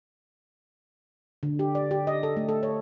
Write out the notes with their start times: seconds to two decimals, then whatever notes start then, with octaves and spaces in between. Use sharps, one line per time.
1.43 D3
1.59 G4
1.75 D5
1.91 G4
2.07 D#5
2.23 A4
2.37 A3
2.49 A4
2.63 C#5